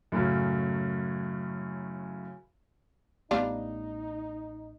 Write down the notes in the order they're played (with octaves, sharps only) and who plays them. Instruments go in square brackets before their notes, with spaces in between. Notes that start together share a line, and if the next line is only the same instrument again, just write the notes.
[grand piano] F#2 A2 C#3 F#3
[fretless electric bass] A1 B3 [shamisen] G3 D4 F4 [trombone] D#4